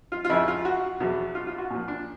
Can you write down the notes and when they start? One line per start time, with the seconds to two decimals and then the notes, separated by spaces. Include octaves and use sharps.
0.12 F4
0.24 F4
0.29 F2 C#3 F3 E4
0.48 F4
0.65 F#4
1.00 E2 B2 F#3
1.35 F4
1.47 F4
1.58 F#4
1.70 A#2 F3
1.88 D4